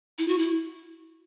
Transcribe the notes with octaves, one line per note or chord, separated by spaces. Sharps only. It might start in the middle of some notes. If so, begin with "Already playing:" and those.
E4
F#4
E4